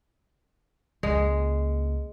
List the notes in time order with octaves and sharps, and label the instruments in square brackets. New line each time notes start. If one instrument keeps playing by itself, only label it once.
[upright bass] C#2 A#3 [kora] G#3